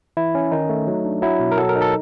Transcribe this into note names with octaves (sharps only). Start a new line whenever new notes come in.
E3 E4
C#4
D#3 D#4
A3
F#3
D4
F#3 E4
B2
A#4
F#3 A4
A#4
D#4
A4